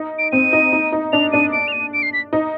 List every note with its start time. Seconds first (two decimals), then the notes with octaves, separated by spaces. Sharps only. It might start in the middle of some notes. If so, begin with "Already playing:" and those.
Already playing: D#4
0.19 D7
0.32 C4 D#7
0.53 D#4
0.73 D#4
0.92 D#4
1.13 D4 F7
1.32 D4 D#7
1.53 D7
1.68 F7
1.72 D#7
1.93 D7
2.03 C7
2.13 B6
2.33 D#4